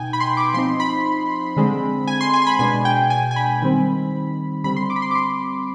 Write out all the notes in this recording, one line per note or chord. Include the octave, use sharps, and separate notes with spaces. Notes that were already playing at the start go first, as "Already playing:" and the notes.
Already playing: B2 B3 D#4 G5 G#5
B5
C6
D6
F3 C4 D#4 C6
B5
D3 G#3 C4
G#5
C6
G#5
C6
B5
B2 G#3 D4 G#5
G5
G#5
G#5
B5
D#3 G3 C4
D3 G3 C4 B5
C6
D6
B5
C6
D6
C6